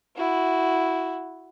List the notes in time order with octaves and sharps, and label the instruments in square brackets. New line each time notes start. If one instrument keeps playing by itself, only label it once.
[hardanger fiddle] E4 F#4